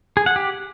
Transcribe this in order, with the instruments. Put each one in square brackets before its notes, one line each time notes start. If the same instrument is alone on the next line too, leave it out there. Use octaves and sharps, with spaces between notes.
[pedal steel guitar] G#4
F#5
G4